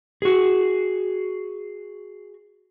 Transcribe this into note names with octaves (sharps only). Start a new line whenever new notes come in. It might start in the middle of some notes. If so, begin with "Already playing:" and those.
F#4 G#4